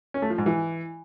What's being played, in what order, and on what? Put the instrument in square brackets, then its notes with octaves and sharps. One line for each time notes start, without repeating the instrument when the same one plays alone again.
[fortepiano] C#4
A3
F3
G#2
E3